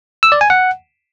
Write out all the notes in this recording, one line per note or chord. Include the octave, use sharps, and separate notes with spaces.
E6
D5
G#5
F#5